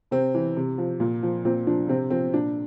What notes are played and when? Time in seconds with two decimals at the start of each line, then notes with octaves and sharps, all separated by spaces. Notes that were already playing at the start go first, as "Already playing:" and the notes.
0.11 C3 C4
0.34 E3
0.57 C3
0.78 F3
1.00 A#2
1.23 F3
1.45 A#2 C4
1.67 F3 D4
1.88 C3 C4
2.10 F3 C4
2.34 A#2 D4